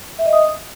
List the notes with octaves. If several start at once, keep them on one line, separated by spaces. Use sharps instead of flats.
E5
D#5
D#6